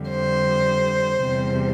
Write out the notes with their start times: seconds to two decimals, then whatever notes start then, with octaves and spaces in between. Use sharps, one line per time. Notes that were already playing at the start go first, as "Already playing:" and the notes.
Already playing: F2 D3 G3
0.10 C5
1.24 E2 C3 G3